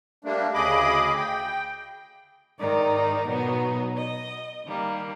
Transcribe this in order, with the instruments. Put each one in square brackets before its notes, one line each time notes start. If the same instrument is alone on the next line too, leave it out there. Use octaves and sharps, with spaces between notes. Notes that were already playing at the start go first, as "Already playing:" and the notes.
[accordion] G3 A3 A#3 D4
D2 C#3 G#4 D#5 B5 D6
G5
[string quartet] G#2 D#3 D#4 D5
B2 F#3 B3 D#4
D#5
D#3 G3 A#3